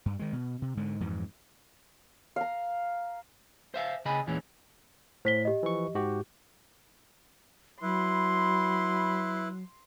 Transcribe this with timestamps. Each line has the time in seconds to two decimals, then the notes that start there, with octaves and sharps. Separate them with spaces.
0.06 G2
0.19 D#3 G#3
0.33 B2
0.62 C3
0.77 G#2 D3 G#3
1.00 F2 G#2 E3
2.36 F5 A#5
3.74 C5 E5 F5
4.05 C#3 G#4 D#5 G#5 B5
4.27 E2 A#2 E3 G#3 C#4
5.25 A2 C5 B6 G7
5.45 G4 D#5
5.63 E3 F3 C#6
5.95 G#2 F#4 G4
7.82 F#3 E4 B4 C6